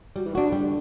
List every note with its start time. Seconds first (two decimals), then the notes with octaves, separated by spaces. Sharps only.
0.16 F#3 G3
0.26 E3
0.34 A2 D4 F#4
0.44 G2
0.52 D3 G3